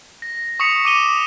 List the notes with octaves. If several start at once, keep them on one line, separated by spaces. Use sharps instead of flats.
A#6
C#6 D#6 B6 C#7 F7
D6 D#7 G7